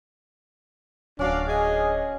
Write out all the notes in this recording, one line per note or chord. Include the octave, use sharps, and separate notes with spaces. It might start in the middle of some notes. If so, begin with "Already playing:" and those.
D1 C#4 D4 F#4 D5 F5
G#4 D#5